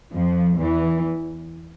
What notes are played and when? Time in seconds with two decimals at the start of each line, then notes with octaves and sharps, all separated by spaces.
0.13 F2 F3
0.59 E2 E3